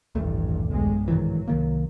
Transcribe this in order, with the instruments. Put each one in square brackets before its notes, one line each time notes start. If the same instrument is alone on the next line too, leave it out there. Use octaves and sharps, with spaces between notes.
[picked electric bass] D#1 A3 [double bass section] A1 G2
[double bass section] B1 G2 G#3
[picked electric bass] G#2 D#3 E3 [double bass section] F#3
[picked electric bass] C2 D#3 A#3